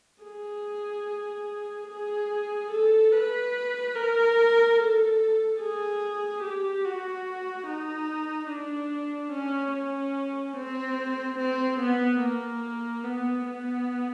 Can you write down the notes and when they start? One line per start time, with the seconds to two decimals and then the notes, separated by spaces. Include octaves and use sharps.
0.23 G#4
1.88 G#4
2.71 A4
3.12 B4
3.95 A#4
4.78 A4
5.60 G#4
6.43 G4
6.84 F#4
7.67 D#4
8.49 D4
9.32 C#4
9.73 C#4
10.56 C4
11.38 C4
11.80 B3
12.21 A#3
13.04 B3
13.46 B3